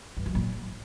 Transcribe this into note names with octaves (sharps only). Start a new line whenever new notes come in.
G2
F#2
A#2